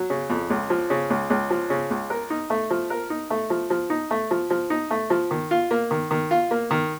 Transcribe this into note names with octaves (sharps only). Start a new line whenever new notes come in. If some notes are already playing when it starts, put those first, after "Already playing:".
Already playing: F#3
C#3
F2
C#2
F3
C#3
C#2
C#2
F3
C#3
C#2
A#4
D#4
A3
F3
A#4
D#4
A3
F3
F3
D#4
A3
F3
F3
D#4
A3
F3
D#3
F4
A#3
D#3
D#3
F4
A#3
D#3